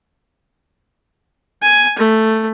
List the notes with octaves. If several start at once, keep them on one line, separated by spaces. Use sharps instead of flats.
G#5
A3